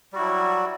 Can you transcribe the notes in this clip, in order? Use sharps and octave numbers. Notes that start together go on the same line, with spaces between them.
F#3 G3 E4 F#4